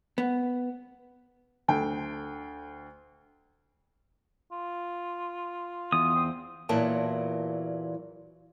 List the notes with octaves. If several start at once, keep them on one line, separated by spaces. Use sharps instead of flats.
B3
D2 G5
F4
E2 D#6
C4
E2 A#2 E3 F#3 A#4 A5